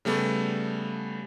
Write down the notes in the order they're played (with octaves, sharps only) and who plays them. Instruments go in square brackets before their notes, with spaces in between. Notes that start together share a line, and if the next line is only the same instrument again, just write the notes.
[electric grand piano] C#3 G3 A3 B3